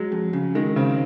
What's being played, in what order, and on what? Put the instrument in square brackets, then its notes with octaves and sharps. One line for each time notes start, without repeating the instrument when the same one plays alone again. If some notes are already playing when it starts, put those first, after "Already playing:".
Already playing: [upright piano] F#3 [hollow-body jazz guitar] G#3
[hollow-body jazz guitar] F2
C#3
[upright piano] D#3 [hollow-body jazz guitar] G#3
[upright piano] C#3 [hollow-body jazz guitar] C4